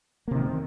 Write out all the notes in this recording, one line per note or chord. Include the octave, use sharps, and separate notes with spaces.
C3 D#3 A#3